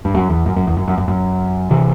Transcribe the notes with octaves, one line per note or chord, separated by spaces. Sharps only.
G2
F#2
E2
F#2
F#2
E2
F#2
F#2
F#2
F#2
C3 E3